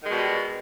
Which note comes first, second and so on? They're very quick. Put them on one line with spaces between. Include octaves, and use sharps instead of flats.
D#3 G#3 B2 G3